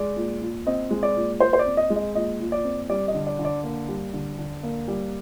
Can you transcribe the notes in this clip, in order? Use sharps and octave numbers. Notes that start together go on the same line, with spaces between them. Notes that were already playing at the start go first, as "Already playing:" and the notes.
Already playing: G#3 D5
A#2
A#2
C4 D#5
G#3
D5
A#2
A#2 C5
C5
D5
C4
D#5
G#3
D#5
A#2 D#5
A#2
D5
C4
G3 D5
D#5
D3
D5
D3
D5
A#3
G3
D3
D3
A#3
G3